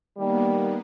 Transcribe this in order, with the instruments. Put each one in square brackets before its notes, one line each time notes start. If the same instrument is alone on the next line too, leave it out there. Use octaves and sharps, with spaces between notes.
[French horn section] D#3 G3 [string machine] A#3 B3